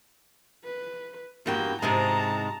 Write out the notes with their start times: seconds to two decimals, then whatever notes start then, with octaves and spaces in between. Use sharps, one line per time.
0.64 B4
1.46 E2 G2 A#3 F#4 G5
1.82 G#2 C3 G#3 A5 A#5